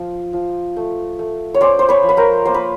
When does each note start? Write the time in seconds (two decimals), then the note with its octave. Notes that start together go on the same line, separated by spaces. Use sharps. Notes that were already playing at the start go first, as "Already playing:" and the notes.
Already playing: F3 F4
0.33 F3
0.76 A3
1.19 A3
1.54 C#5
1.61 C#4 C5 D5
1.79 C5
1.89 B4 C#5
2.03 F3
2.09 B4
2.17 A#4 C5
2.45 A#3 C5
2.54 B4